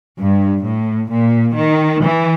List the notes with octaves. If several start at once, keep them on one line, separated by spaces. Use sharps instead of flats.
G2
A2
A#2
D#3
E3